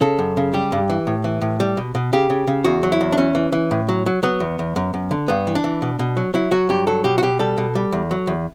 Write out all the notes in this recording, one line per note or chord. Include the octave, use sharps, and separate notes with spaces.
C#3 A4
F#2
C#3
G3 G4
G2
E3
A2
E3
A2
G3
B2
B2
C#3 G4
C#3
C#3
E2 F#4
F#3
E4
E2
D4
E3 C#4
E3
E3
A2
F#3
F#3
F#3 B3
E2
E2
F#2
F#2
D3
G2 B3
E3
D4
E3
B2
B2
F#3
F#3 E4
F#3 F#4
G2 G4
F#3 A4
B2 G4
F#4
B2 G4
G3 A4
B2
G3
E2
F#3
E2